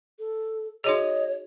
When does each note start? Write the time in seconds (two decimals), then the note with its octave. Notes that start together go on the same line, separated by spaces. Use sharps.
0.19 A4
0.84 D#4 F#4 G#4 C#5 D#5